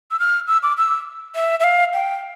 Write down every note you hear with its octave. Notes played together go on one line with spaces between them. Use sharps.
E6
F6
E6
D6
E6
E5
E5
F5
G5